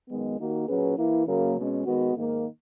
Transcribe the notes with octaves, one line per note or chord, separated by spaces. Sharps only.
F#2 D#3 G#3 B3
D#2 D#3 A#3 D#4 F#4
A#2 F#3 C#4 G#4 B4
E3 A#3 E4
F#2 C#3 F#3 A#3
B2 G#3 C#4
D#3 G#3 B3 F#4 B4
G#2 D#3 A#3